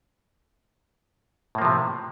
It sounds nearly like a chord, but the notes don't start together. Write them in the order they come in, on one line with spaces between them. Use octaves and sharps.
A2 A#3 F3 C3